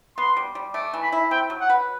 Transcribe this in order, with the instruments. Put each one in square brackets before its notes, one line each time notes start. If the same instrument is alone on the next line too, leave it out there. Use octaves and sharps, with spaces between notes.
[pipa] B3 [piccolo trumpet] C6
[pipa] G3
G3
[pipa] A3 [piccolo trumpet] D6
[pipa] E3
[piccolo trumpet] B5
[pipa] E4
[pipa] C4 [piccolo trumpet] G5
[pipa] F#3
[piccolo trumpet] F#5
[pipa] B4